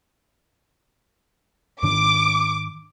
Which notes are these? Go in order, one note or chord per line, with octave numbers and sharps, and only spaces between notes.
G#2 D#3 D4 D6